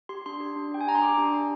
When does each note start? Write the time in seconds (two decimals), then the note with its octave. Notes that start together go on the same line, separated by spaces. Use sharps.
0.09 G4 C6
0.26 D4 C6
0.40 G4
0.56 D4
0.72 G4 G5
0.81 G#5
0.88 D4 A#5
0.95 C6
1.02 G4 D6
1.18 D4
1.34 G4